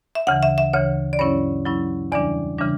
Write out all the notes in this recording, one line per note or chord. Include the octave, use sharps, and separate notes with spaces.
E5
D2 C#3 E3 F#5
E5
E5
D2 C#3 E3 C#5
D5
G2 F#3 C#4 E4 C#5
G2 F#3 C#4 E4
E2 C#3 E3 G3 D4 D5
C#3 E3 G3 D4